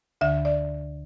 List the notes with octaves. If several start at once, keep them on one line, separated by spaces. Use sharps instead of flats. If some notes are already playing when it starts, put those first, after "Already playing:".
D2 D3 E5
D5